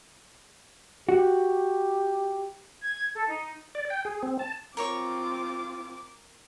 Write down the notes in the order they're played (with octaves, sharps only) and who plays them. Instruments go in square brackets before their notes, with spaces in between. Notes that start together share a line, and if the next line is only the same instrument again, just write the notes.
[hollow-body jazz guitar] F#4 [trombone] G4
[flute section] G#6
A4
D#4
[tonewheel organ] D5
G5
G#4
C4
A5
[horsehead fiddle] C4 F4 [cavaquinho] A#4 C#5 C#6 [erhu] D6